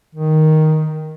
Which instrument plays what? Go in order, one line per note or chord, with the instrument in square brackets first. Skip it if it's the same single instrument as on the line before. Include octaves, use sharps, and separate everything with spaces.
[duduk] D#3